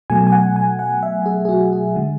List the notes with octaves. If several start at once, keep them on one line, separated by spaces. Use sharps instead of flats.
B2 F#3 A3 G#5
G#5
F#5
G#5
F#5
E5
G#4
G#4
F#4
G#4
D3 G#3